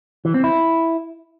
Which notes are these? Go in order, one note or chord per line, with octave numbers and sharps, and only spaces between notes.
E3
C4
E4